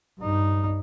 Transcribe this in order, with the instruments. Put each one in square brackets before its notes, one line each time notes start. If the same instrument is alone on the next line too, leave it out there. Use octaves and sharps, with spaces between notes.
[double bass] G2 D#4